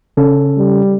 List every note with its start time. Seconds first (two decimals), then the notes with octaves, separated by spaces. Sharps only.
0.17 C#3 C#4 A4
0.58 G3